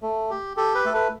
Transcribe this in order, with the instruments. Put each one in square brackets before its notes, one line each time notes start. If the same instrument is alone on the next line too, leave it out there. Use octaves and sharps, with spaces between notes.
[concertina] A3
G4
G4 A4
B4
A3 A4
B4